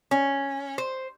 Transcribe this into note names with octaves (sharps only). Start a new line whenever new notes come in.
C#4
C5